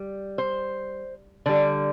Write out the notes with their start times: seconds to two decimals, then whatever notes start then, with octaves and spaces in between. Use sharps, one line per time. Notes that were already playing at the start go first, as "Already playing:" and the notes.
Already playing: G3
0.38 C5
1.46 D3 G3 D5